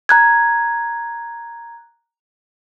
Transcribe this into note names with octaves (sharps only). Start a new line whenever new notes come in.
A#5 F#6 G#6